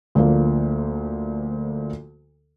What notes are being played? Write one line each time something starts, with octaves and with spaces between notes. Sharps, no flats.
D2 D3 F3 A#3